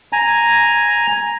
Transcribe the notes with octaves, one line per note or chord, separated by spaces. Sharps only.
G#5 A#5